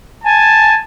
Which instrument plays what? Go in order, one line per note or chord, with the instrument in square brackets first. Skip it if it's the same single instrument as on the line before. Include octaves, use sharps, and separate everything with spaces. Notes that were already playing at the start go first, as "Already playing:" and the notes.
[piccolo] G#5 [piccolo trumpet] A5